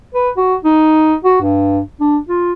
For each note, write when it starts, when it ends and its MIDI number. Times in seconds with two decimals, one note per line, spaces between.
0.15 0.30 71
0.37 0.55 66
0.65 1.16 63
1.24 1.37 66
1.41 1.80 43
2.00 2.18 62
2.29 2.52 65